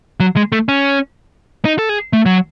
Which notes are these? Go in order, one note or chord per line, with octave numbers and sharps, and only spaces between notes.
F#3
G#3
A3
C#4
D#4
A4
G#4
A3
F#3